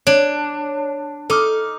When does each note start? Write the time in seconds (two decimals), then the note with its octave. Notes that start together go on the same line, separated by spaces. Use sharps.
0.07 D4 C#5
1.30 D#4 A4 D6 F6